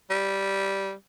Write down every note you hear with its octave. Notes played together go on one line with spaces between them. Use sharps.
G3